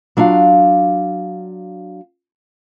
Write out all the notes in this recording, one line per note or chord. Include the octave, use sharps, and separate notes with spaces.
F#3 D4 F4 F5